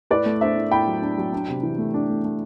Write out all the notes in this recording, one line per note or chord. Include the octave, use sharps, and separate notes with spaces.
A2 B4 D5
A3
D4 C5 E5
A2
A2 G5 B5
F#3
D4
F#3
D4
C3
E3
A3
D4
A3
A3